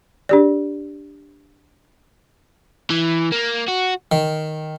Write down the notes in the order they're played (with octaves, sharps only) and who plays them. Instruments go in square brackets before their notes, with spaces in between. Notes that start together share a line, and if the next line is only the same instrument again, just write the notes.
[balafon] D4 G4 D5
[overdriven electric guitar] E3
A#3
F#4
[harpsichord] D#3